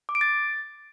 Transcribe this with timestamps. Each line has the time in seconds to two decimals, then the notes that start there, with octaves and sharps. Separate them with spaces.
0.09 D6
0.15 D7
0.21 A6